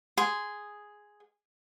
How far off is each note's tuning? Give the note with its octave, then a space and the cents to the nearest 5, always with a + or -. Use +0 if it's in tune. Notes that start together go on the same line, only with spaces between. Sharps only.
G#4 +0 C6 -10